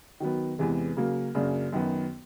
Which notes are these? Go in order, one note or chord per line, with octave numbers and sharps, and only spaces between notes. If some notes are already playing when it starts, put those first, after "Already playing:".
D#3 F#3 B3
E2 C3 E3 G#3
C#3 F#3 A#3
F#2 C#3 F#3 A#3 D4
F#2 D#3 F#3 B3